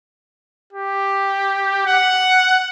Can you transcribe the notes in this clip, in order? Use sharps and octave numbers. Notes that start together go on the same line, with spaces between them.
G4
F#5